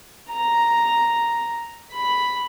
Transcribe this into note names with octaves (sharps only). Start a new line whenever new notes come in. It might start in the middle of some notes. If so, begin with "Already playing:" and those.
A#5
B5